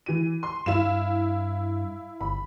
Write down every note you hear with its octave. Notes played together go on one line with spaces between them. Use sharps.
E3 D#7
C6
G2 E4 F5 E7
G1 B5